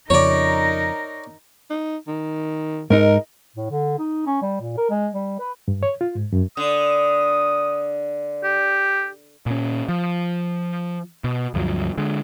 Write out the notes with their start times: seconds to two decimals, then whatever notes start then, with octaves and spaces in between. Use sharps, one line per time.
0.10 F2 C#3 D#4 A#4 C#5 D5
1.70 D#4
2.08 D#3
2.90 G#2 D#4 A#4
3.56 A2
3.70 D3
3.99 D#4
4.26 C#4
4.42 G3
4.61 A#2
4.77 A#4
4.90 G#3
5.13 G3
5.39 B4
5.68 G2
5.83 C#5
6.01 F4
6.15 G#2
6.32 F#2
6.57 D3 D#6
8.44 G4
9.46 A#2 C#4
9.89 F3
11.24 B2
11.54 D2 G2 F3 F#3
11.98 D3 G#3